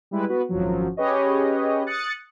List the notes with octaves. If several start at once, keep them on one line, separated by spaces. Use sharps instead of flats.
G3 G#3 E4 B4
B3 F#4 B4
G#1 F#2 F3 F#3
C#4 G4 G#4 B4 C#5 D#5
D#6 F#6 A6 C#7